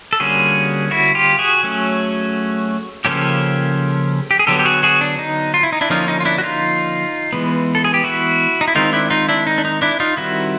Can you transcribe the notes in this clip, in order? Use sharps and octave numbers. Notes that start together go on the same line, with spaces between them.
A4
D3 G3 A#3 C#4 F#4 G#4
E4 F#4
F4 G4
F#4 G#4
F#3 A3 C#4
C#3 F3 A#3 C#4 G4 A4
G4
G#4
D3 F#3 B3 G4 A4
G4
F#4 G#4
F#4 G#4
D4
D#4
F4
E4
D#4
D4 E4
D3 F3 A#3 C#4 D#4 F4
D#4
F4
D4 E4
F#4
D#4 F4
E3 G#3 B3
A4
G#4
G4
E4 F#4
D#4
E4
D#3 G#3 C4 D#4 F4
D4 E4
D#4 F4
D4 E4
D#4
D4
D#4
D4 E4
D#4 F4
D#3 G3 C4 E4 F#4